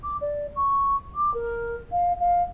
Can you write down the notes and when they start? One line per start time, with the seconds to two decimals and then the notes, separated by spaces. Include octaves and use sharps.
0.03 D6
0.21 D5
0.56 C#6
1.15 D6
1.34 A#4
1.92 F5
2.20 F5